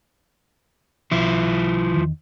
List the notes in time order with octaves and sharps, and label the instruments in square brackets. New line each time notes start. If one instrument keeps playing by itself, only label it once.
[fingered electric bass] B1 [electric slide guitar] F3 E4
[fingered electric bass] E2 D#3